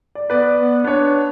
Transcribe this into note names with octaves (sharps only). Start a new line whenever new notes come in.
D5
B3 B4 D5
B3
B3 D4 C#5